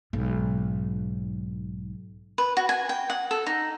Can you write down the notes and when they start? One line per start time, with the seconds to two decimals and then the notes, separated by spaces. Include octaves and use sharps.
0.13 B1 G#2
2.38 B4
2.57 F#4
2.69 G#5
2.89 G5
3.10 F#5
3.31 A4
3.46 D#4